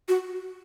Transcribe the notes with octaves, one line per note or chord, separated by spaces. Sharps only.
F#4